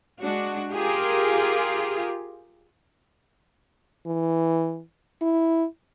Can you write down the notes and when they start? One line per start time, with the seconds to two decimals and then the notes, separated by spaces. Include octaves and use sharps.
0.22 G#3 D4 F#4
0.72 F4 G4 G#4 A#4
4.07 E3
5.22 E4